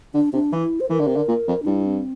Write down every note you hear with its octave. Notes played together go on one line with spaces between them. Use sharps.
D3 D4
C3 D4
E3 E4
C5
E3 A#4
D3
C3
D3
A#2
F2
D4
G2 E4
C4